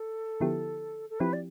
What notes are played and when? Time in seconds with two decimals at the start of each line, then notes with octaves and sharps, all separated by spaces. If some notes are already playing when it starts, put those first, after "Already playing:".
Already playing: A4
0.40 D3 F3 B3 E4 G4
1.10 A4
1.20 F3 C4 E4 G4 B4
1.33 D5